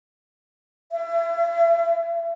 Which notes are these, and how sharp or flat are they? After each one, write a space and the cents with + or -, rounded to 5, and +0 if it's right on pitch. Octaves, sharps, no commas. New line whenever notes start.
E5 +35